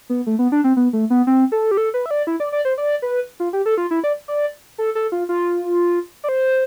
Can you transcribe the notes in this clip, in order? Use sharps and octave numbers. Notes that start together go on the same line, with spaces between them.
B3
A3
B3
D4
C4
B3
A3
B3
C4
A4
G4
A4
B4
E5
D5
E4
D5
D5
C5
D5
B4
F4
G4
A4
F4
E4
D5
D5
A4
A4
F4
F4
D5
C5